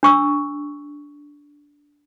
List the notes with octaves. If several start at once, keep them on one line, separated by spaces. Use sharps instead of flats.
D4 C#6 E6